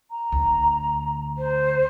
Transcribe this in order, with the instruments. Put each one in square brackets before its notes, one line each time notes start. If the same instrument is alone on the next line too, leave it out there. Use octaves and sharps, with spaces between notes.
[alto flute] A#5
[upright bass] D2
[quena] C5